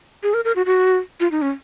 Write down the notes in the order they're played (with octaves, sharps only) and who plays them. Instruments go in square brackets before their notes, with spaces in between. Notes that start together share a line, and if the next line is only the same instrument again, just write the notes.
[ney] G#4
A#4
A#4
F#4
F#4
F4
D#4
C#4